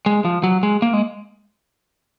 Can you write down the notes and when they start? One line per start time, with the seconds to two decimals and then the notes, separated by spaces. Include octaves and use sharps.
0.06 G#3
0.25 F3
0.44 F#3
0.63 G#3
0.82 A#3
0.93 G#3